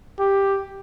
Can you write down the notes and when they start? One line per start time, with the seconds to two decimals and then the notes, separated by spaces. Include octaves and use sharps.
0.19 G4